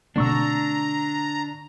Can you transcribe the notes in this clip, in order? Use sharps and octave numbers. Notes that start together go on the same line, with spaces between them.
B2 D3 A3 C4 D4 A#5 C#6 E6